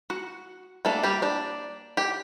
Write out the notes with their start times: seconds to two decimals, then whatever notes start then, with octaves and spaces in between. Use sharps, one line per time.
0.10 F#4 F#5
0.85 G3 A3 A#3 D4 A4
1.03 G3 G4
1.22 D4 D5
1.97 G4 G5